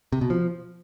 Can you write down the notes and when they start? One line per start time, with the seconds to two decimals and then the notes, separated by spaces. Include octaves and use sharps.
0.13 C3
0.21 B2
0.30 F3